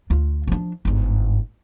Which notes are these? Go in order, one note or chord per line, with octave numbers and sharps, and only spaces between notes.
D2 F4
F3 D4
G1 G#2